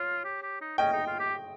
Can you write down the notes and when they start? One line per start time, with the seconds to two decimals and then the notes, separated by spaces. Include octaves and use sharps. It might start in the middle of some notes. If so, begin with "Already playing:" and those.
Already playing: F4 C#5
0.24 G4
0.43 G4
0.61 D#4
0.78 C#4 D#5 G5
0.93 D#4
1.07 F4
1.20 G4